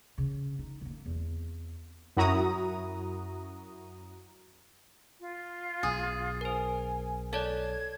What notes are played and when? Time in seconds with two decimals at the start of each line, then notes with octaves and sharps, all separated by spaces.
0.18 C#3 C#4
0.59 D#4
0.81 D3 A#3
1.06 E2 C4
2.17 F#2 E4 F#4 A#5 D#6
5.20 F4
5.83 B1 G#4
6.41 A#4 C5 G#5
7.33 A4 C#5 D5 A5 G#6